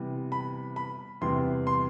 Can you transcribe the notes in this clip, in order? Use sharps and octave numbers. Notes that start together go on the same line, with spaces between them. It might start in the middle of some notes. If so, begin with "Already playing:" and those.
Already playing: C3 E3 G3 B3
B5
B5
E2 C3 E3 G3 C6
C6